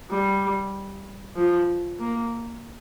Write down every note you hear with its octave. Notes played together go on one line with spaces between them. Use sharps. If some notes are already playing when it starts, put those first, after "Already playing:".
G3
F3
A#3